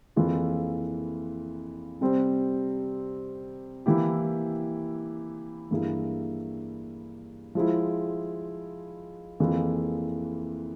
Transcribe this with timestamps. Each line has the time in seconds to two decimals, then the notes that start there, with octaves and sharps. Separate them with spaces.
0.16 F2 E3 A#3 F4 G#4
2.01 C3 G3 C4
3.86 E3 A#3 E4 G4
5.70 G2 E3 A#3 E4 G#4
7.55 F3 G#3 E4
9.40 F2 E3 A#3 F4 G#4